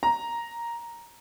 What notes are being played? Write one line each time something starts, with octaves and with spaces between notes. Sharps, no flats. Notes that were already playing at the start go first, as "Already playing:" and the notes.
A#5